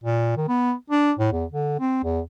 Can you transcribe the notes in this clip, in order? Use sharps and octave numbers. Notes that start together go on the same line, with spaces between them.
A#2
D#3
B3
D4
A2
E2
D3
C4
E2